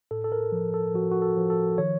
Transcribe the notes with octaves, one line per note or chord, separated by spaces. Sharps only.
A2 A4
A4
A#4
F3
A4
F3 F#4
F#4
A4
F3
A4
D#3 C#5